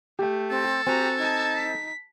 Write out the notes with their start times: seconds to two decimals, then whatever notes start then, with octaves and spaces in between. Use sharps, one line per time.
0.19 A3 G4 G5
0.50 C4 A4
0.87 C4 F#4 G4 G#5 A#5
1.18 D#4 A5 G#6
1.56 B6